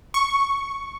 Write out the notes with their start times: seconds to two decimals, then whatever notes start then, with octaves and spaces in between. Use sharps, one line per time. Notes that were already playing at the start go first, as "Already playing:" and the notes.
0.14 C#6